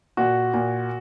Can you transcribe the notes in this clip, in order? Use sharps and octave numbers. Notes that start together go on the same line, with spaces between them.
A#2 F#4
A#2